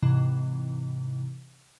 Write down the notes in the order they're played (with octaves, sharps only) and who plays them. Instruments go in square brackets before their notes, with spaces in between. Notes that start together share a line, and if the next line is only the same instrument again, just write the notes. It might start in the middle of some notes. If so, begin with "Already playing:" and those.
[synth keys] G#2 C3 E3